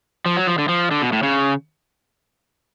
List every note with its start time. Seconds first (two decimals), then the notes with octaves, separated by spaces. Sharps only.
0.26 F3
0.36 F#3
0.47 F3
0.58 D3
0.69 F3
0.91 D3
1.02 B2
1.13 A2
1.23 C#3